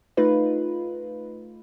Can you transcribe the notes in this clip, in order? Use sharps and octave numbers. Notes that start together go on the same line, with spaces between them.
A3 D#4 F4 B4